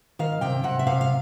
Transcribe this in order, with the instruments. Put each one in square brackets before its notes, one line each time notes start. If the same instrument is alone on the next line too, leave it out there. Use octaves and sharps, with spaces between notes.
[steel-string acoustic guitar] D#3 F5
C3 G5
C3 F#5
E5
C3 F5
F5